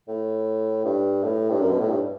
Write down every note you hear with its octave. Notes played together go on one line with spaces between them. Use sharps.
A2
G2
A2
G2
F#2
B2
A2
G2